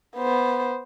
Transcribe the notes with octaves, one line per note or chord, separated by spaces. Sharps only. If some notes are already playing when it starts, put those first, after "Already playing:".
B3 C5